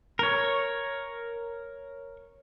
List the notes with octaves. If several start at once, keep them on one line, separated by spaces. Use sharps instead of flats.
A#4 C#5